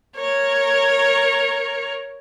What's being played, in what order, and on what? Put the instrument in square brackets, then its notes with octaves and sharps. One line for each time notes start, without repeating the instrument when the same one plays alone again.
[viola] A#4 C#5